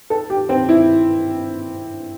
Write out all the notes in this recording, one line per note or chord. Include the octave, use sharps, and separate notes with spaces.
A4
G4
C4
E4